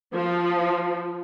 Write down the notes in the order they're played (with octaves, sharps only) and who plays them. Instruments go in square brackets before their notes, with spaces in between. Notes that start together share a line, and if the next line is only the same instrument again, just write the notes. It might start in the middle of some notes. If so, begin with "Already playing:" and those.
[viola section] F3